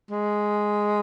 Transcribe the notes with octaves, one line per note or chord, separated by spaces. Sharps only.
G#3